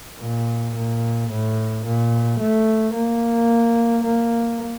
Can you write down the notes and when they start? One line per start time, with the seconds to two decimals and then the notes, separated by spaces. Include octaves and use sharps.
0.20 A#2
0.75 A#2
1.30 A2
1.85 A#2
2.40 A3
2.94 A#3
4.04 A#3